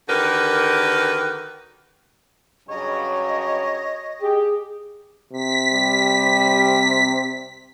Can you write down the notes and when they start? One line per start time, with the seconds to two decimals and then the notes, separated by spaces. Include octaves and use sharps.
0.08 D3 D#3 F#4 G4 A#4 B4
2.69 G2 C#3 F#3 C#5 D#5
4.21 G4 G#4
5.33 C3 B6
5.73 G3